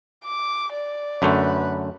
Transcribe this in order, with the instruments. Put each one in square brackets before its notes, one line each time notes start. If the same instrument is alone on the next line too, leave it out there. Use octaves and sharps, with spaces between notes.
[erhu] D6
D5
[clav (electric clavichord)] F#2 D3 A3 [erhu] B4